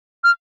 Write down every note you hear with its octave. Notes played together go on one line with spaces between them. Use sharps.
F6